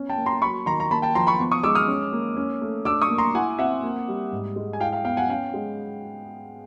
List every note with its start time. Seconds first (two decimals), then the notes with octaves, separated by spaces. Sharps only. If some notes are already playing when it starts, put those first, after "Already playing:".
Already playing: B3 C#4
0.09 G5 A5
0.17 A#3
0.26 A#5 C6
0.42 F#3 B5 C#6
0.66 D#3 A#5 C6
0.80 A#5
0.91 A#3 A5 B5
1.02 G5 A5
1.15 F3 A#5 C6
1.27 B5 C#6
1.39 B3
1.51 C#6 D#6
1.63 G#3 D6 E6
1.75 D#6 F6
1.88 C#4
2.13 A#3
2.37 C#4
2.62 A3
2.85 D4 D6 E6
3.02 C#6 D#6
3.10 A#3
3.18 A#5 C6
3.34 E4 F#5 G#5
3.59 C4 E5 F#5
3.83 A#3
4.08 G3
4.32 G#2
4.56 G#3
4.73 G#5
4.80 E4 F5 G5
4.93 F5 G5
5.05 B3 F5 G5
5.17 F#5 G#5
5.29 C#4 F5 G5
5.54 G#3